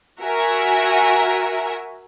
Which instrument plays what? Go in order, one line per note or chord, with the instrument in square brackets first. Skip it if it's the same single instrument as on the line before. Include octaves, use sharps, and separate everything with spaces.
[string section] F#4 A#4 E5 G#5